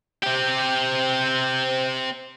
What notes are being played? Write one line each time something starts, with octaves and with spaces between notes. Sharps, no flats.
C4 G4